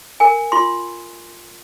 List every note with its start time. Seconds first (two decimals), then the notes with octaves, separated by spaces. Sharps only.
0.20 A#4 G#5
0.52 F4 C6